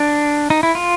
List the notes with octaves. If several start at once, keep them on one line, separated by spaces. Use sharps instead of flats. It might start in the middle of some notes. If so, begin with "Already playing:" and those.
Already playing: D4
D#4
E4
F4